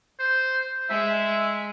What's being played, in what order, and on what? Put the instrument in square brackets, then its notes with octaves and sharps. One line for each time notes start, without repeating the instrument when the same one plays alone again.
[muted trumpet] C5
[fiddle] G#3 [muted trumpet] E5